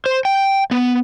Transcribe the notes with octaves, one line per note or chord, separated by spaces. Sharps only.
C5
G5
B3